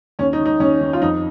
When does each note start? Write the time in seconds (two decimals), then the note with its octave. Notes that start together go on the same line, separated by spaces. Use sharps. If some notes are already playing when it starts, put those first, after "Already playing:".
0.19 D#2 C#4
0.33 D#4
0.39 D#3
0.46 D#4
0.60 D#2 C#4
0.81 D#3
0.93 F4
1.01 F2 D#4